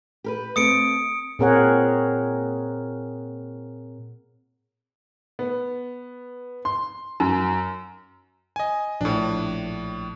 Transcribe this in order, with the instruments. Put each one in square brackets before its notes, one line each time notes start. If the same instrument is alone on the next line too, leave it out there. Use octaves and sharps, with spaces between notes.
[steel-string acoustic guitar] G4 A#4 B4
[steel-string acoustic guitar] A3 C4 [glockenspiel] D#6 C#7 D7
[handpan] A#2 C4 G#4 A#4 C#5 F#5
[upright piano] B3
C6
F#2
[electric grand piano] D#5 G#5
[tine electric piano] A#1 [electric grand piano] A2 D4